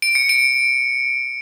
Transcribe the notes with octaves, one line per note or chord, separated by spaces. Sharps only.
D7
C#7
D7